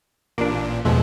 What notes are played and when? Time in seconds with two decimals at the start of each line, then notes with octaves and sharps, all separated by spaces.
0.38 A1 A#2 A#3 D4
0.85 E2 G2 B2 F3 G#3 A3